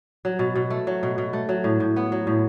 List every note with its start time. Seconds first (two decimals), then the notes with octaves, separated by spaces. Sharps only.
0.25 F#3
0.39 B2
0.55 B2
0.70 A3
0.87 F#3
1.03 B2
1.18 B2
1.33 A3
1.49 F#3
1.64 A2
1.80 A2
1.96 B3
2.12 F#3
2.27 A2